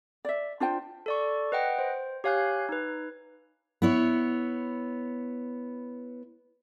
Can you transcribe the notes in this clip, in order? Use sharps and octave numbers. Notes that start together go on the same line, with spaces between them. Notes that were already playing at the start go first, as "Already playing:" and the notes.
D5 E5
D4 F4 C5 G5
A4 D5 C#6
B4 D#5 F#5 G5
C5
G4 C#5 F5 G#5 F#6 G6
D#4 B4
B3 E4 C#5